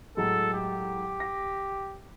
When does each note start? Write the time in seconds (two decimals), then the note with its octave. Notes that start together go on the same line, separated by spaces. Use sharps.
0.17 A2 F#3 G#3 A4
0.53 G4
1.20 A#6